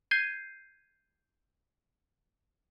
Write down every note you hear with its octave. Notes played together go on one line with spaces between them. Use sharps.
G6 G#6 C7 D#7